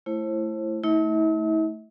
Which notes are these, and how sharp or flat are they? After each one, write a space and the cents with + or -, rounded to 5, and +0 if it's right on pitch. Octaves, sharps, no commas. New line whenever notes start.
A3 +0 E4 +20 C5 +35
A3 +0 E4 -45 E5 -45